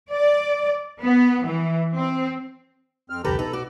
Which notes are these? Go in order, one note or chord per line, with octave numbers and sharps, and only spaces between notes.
D5
B3
E3
C4
F2 C4 F6
C2 F2 D3 G4 A4 B4 A#5
B2 D#4 A4 B4 A#5
F#4 D6